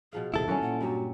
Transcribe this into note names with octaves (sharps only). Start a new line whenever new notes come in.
B2 F3 G#4 F5
D#1 C2 C3 E4 G#4 A4
F#2 D#3 F#3 G3 C#4 F#4
A#2 F#5
G2 F#3 F#4 G4